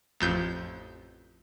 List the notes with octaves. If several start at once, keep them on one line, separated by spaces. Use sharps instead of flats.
A1 F2 G6